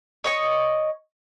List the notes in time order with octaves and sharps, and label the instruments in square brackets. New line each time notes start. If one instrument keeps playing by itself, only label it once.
[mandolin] C#5 D#5 C#6